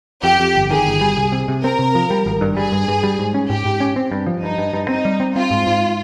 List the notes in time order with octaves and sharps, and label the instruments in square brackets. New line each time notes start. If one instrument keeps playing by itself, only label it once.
[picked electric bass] F2 [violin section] G4
[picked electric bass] F2
G1
[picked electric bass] D#3 [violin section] G#4
[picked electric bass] G1
G3
C2
C3
C3
[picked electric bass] C4 [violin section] A#4
[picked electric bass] C3
F3
G3
G#1
G2
[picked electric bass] G3 [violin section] G#4
[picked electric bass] G2
G2
G3
G#2
C#4
[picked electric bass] G#2 [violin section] G4
[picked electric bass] G#2
C#4
C4
G2
F3
[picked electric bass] G2 [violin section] D#4
[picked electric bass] G2
G2
[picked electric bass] C4 [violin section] D#4
[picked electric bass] G3
C4
[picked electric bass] C4 [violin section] F4
[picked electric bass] G#2
G#2